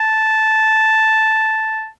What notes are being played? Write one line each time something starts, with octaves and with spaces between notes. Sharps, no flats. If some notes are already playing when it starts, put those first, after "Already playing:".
Already playing: A5